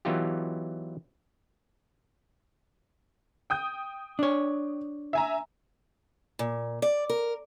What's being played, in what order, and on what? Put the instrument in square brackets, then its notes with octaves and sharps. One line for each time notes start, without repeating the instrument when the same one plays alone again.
[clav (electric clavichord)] E3 F#3 B3 D#4 F4 G4
[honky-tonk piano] G5 D#6 G6
[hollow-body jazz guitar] D4 C#5
[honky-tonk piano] E5 G#5 A#5
[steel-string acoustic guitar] A#2
D5
A#4